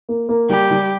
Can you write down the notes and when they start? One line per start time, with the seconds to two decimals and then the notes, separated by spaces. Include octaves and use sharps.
0.09 A#3
0.29 A#3
0.49 G3 G4
0.71 G3